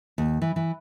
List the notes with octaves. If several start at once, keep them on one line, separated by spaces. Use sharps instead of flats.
D#2
E3
E3